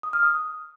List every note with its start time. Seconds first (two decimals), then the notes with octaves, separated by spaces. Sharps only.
0.03 D#6
0.13 F6
0.23 D#6